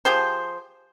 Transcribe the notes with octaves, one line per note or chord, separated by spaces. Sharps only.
F3 G4 G#4 C5